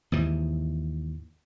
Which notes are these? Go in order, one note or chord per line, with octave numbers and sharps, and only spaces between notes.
D#2 G#2 E3